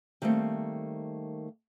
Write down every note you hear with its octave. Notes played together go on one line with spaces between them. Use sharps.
D#3 G3 A3 A#3 C4